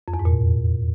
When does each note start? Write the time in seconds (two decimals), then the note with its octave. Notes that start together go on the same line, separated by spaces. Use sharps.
0.08 F2
0.14 E2
0.19 G#2
0.25 A#2